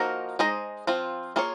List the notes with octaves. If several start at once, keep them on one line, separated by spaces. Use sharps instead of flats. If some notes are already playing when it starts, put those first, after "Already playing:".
Already playing: F3 A#3 D#4 F#4 A#4
G#3 D#4 G#4 C5 D#5
F3 C4 F4
A#3 F4 G#4 C#5